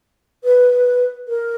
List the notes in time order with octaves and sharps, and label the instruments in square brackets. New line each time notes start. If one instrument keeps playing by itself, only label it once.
[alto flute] B4
A#4